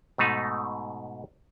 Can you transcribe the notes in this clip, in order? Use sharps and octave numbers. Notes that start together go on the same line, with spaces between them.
G#2 B2 A3 D#4